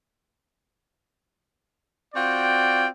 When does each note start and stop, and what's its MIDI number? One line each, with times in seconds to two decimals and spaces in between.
2.14 2.87 60
2.14 2.87 65
2.14 2.87 66
2.14 2.87 74
2.14 2.87 79